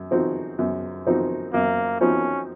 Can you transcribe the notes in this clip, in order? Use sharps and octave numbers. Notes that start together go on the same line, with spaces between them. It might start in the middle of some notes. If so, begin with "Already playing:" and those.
Already playing: F#2
F3 C4 D#4 F#4
F#2
F3 C4 D#4 F#4
F#2 A#3
F3 C4 C#4 D#4 F#4